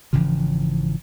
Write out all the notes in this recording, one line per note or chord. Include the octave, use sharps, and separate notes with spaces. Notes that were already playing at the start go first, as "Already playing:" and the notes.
G#1 C#3 E3 F3